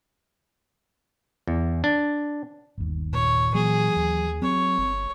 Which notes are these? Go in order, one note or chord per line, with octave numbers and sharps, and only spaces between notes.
E2
D4
G1 D#2
A#2 C#5
E3 F#3 A#3 G#4
D#2
F#3 C4 C#5
G1